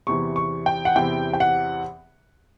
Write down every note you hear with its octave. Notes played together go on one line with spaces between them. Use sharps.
E2 C3 E3 C#6
C#6
G5
F#5
E2 C3 E3 G5
G5
F#5